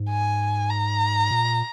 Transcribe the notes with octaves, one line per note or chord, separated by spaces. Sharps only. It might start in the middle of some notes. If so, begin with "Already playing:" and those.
Already playing: G#2
G#5
A#5
A#2